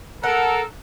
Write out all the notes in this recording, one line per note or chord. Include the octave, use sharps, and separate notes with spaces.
A4 A#4 F#5